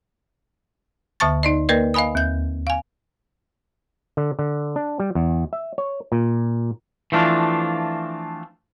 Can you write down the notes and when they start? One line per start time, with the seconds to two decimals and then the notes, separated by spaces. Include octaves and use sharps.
1.20 D2 D3 E5 A5 C#6 A6
1.43 D#4 D5 D#5
1.69 A#3 A#4 B4 D5 D#5
1.94 D#5 F5 G#5 B5 D#6
2.15 D#2 G6
2.67 F5 G#5
4.17 D3
4.39 D3
4.76 D4
5.00 G3
5.15 E2
5.53 E5
5.78 C#5
6.12 A#2
7.12 E3 F3 A3 C4 D4 F4